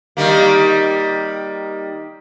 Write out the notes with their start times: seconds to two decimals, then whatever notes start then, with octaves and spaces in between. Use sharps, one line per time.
0.17 D#3 G3 A#3